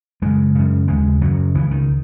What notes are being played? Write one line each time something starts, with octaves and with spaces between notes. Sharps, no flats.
F#2 C#3 G#3
F#2 C#3
D#2 C#3 G#3
F#2 C#3 F#3
C#2 C#3 E3
D#3